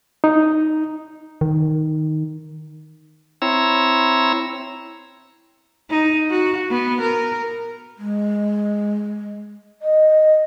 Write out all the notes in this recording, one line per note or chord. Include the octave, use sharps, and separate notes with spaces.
D#4
D#3
C4 E4 C#5 A#5 E6
D#4
F#4
B3
A#4
G#3
D#5